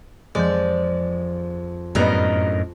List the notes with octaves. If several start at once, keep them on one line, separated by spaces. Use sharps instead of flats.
F2 F3 G#3 D5 G6
F#2 A2 G3 B3 A#4 D#5